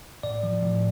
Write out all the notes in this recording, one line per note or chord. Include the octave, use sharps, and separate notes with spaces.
A2 D5
F3
A2